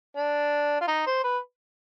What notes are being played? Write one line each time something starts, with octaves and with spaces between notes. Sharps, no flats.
D4
F4
D#4
C5
B4